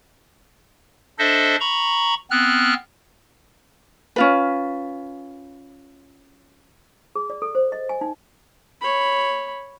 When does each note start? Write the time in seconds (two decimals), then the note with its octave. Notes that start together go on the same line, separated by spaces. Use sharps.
1.19 D4 A4 C5 D#5 E5
1.60 A#5 B5 C#6
2.31 B3 C4 F6 F#6
4.16 C#4 F4 B4
7.15 G#4
7.30 D5
7.42 A4
7.55 C5
7.72 D#5
7.89 G#5
8.01 D#4
8.81 C#5 B5